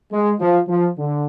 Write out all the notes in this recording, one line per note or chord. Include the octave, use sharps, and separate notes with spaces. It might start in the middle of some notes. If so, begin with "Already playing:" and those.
G#3
F3
F3
D3